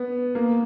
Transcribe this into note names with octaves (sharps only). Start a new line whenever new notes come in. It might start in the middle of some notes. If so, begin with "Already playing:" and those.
Already playing: B3
A#3